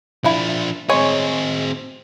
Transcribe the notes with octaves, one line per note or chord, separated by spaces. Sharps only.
F3 D4 E4 F5
G#3 C4 G#4 C#5